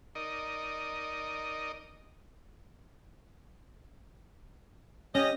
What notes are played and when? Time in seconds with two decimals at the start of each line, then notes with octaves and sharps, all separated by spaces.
0.15 D#4 A#4 D5 D#5
5.15 C#4 G4 D#5